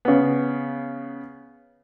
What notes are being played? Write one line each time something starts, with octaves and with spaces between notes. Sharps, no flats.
C#3 B3